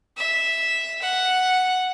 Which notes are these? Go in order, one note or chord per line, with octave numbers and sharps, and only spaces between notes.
E5
F#5